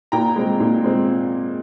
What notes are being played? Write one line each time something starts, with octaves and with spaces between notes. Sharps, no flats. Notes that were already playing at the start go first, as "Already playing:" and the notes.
A#2 G5 A#5
G#3 C4
A#2
G#3 C4